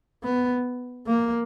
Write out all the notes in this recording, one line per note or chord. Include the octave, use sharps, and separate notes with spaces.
B3
A#3